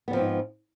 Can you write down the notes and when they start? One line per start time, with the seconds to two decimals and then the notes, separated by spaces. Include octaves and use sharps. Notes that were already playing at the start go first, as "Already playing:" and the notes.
0.08 B3
0.11 G3
0.13 F3
0.16 C4
0.19 G#2